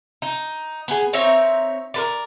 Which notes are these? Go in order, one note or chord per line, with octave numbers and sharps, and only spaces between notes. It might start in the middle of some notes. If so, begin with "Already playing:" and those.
D#4
B3 G#4
C4 D#4 C#5 E5
A#4 B4 D5